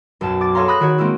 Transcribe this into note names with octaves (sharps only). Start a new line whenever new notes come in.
B1 F#2 A5
D6 A6
G#4 A4 C#5 F5 A#5 C6
B5 D#6 F#6 A#6
D#3 F#4 C#5
G#3 A#3 C4 C#4 E4